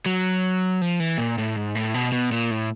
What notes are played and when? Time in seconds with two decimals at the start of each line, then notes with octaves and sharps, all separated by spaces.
0.06 F#3
0.82 F3
1.00 E3
1.18 A#2
1.38 A2
1.56 G#2
1.75 A2
1.94 B2
2.12 B2
2.32 A#2
2.51 A2